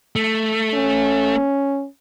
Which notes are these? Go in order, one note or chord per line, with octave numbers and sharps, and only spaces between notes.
A3
C#4